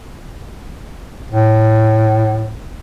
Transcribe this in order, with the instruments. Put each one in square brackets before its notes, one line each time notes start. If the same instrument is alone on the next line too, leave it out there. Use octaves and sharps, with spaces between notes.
[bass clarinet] A2